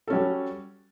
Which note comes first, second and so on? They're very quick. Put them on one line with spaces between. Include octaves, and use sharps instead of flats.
A4 C#4 G3 F#4